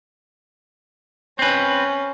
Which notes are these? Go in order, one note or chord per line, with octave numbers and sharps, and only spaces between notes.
C4 C#4 B4